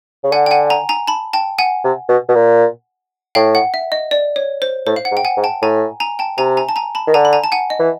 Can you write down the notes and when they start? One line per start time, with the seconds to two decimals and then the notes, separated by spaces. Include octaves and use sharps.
0.24 C#3
0.32 D3 F#5 G#5
0.46 G5
0.51 F#5 G#5
0.70 G#5 A#5
0.89 G#5 A#5
1.07 A5 B5
1.33 G5 A5
1.59 F#5 G#5
1.84 C3
2.09 B2
2.29 B2
2.35 A#2
3.35 A2 F5 G5
3.55 F#5
3.74 E5
3.92 D#5
4.11 D5
4.36 C#5
4.62 C5
4.87 A2 C5
4.96 F5
5.05 F#5
5.12 G#2
5.17 G5
5.25 F#5 G#5
5.37 G#2
5.44 G5 A5
5.62 A2 G#5 A#5
6.00 G#5 A#5
6.19 G5 A5
6.38 C3 G#5 A#5
6.57 G#5 A#5
6.69 A5
6.76 G#5 A#5
6.95 A5 B5
7.08 D#3
7.14 D3 G#5 A#5
7.25 B5
7.33 G#5 A#5
7.44 A5
7.52 F#5 G#5
7.70 D#5
7.80 E3